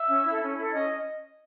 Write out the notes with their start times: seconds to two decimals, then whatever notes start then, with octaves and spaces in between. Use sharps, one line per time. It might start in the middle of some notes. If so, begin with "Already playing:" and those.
Already playing: E5 E6
0.09 C#4
0.24 E4
0.30 A4
0.41 C#4
0.58 E4 A4
0.73 C#4 D#5 D#6